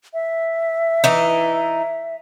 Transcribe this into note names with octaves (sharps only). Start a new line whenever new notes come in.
E5
E3 D#4